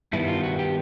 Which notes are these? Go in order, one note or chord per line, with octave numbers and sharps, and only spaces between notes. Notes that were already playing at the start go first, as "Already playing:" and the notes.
G2 D#3 G3 B3 E4
F4
F#4
G4